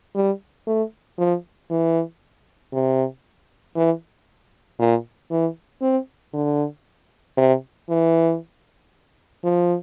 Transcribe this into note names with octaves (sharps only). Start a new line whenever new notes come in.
G3
A3
F3
E3
C3
E3
A#2
E3
C4
D3
C3
E3
F3